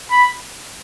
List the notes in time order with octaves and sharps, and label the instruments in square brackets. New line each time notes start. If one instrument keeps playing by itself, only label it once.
[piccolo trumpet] B5